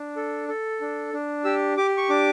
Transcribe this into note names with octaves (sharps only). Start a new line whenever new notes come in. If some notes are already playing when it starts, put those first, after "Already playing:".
Already playing: D4
A4
A4
D4
D4
G4 E6
G4 D6
C#6
D4 D6